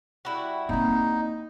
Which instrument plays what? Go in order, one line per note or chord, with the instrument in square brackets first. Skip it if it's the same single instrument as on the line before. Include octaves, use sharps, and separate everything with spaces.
[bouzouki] G3 E4 F#4
[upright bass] A#3 C4 [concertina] D#4